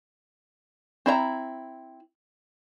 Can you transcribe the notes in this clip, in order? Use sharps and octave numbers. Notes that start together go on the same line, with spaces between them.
C4 E4 E5 A#5